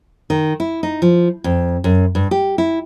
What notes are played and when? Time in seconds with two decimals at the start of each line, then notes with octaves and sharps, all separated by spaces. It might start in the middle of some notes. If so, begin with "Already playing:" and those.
0.30 D#3
0.60 E4
0.83 D#4
1.02 F3
1.44 F2
1.84 F#2
2.15 G2
2.31 G4
2.58 E4